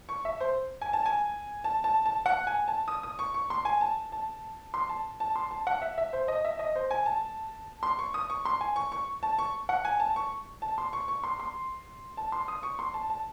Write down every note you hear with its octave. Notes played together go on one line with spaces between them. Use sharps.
C#6
E5
C5
G#5
A5
G#5
A5
A5
A5
F#5
G#5
A5
D#6
D#6
C#6
C#6
C6
G#5
A5
A5
C6
A5
A5
C6
A5
F#5
E5
E5
C5
D#5
E5
D#5
C5
G#5
A5
C6
C#6
D#6
C#6
C6
G#5
C#6
C#6
A5
C#6
F#5
G#5
A5
C#6
A5
C6
C#6
C#6
C6
C6
A5
C6
D#6
C#6
C6
A5
A5